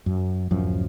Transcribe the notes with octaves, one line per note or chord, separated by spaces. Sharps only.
F#2
D1 F#2 F3